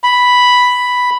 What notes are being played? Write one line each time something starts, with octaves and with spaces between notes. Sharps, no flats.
B5